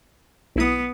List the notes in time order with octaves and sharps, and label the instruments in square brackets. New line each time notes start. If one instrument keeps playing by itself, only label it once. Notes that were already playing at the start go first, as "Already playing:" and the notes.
[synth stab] B1 E4 D#6 [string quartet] B3